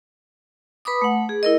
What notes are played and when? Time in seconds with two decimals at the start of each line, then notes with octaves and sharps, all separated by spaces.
0.85 B4 B5 D6 D#6
1.02 A3 F#5
1.29 G#4
1.43 E4 A#4 D#5